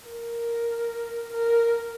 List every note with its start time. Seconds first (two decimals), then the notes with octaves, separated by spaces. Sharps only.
0.08 A#4
1.34 A#4